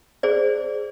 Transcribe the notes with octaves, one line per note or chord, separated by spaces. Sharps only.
G#4 C5 D5